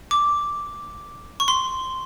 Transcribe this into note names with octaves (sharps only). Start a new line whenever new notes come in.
D6
C#6
C6